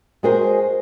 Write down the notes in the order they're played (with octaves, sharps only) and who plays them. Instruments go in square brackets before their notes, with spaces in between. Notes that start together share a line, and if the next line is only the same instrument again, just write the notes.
[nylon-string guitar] G#3 F#4 G#4 A#4 C5